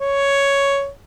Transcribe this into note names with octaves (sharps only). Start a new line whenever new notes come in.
C#5